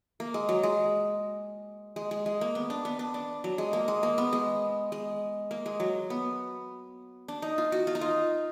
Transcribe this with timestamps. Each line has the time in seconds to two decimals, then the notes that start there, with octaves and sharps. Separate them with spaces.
0.20 A#3
0.34 G#3
0.49 F#3
0.63 G#3
1.96 G#3
2.11 G#3
2.26 G#3
2.41 A#3
2.55 B3
2.70 D4
2.85 B3
2.99 D4
3.14 D4
3.44 F#3
3.58 G#3
3.73 A#3
3.88 G#3
4.03 A#3
4.18 B3
4.33 G#3
4.92 G#3
5.51 A#3
5.66 G#3
5.80 F#3
6.10 B3
7.28 D4
7.42 D#4
7.58 F4
7.72 F#4
7.87 F4
7.95 D#4
8.01 F4